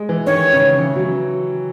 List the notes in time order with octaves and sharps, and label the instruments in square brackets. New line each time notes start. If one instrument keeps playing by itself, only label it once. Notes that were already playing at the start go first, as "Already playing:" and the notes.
Already playing: [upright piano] G#3
E3
[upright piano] D#3 [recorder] C#5
[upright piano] C#3
E3
F#3